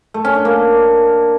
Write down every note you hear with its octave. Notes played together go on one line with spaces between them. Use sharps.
A3
C#4
D4
A#3